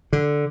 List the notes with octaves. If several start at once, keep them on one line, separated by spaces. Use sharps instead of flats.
D3